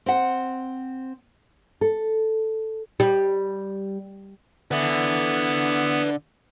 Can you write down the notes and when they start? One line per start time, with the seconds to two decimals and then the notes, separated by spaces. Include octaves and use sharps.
0.06 C4 F#5
1.81 A4
3.00 G3
4.71 D3 B3 B4 E5